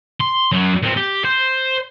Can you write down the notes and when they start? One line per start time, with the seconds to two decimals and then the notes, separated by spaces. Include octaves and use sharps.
0.20 C6
0.52 F#2 F#3
0.83 A#2 C4
0.97 G4
1.25 C5